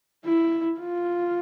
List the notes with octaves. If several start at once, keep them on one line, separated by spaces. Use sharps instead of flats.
E4
F4